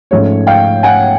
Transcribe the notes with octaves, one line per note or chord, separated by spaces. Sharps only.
G#2 F3 A3 C#4 C#5
F5 G5
F#5 G#5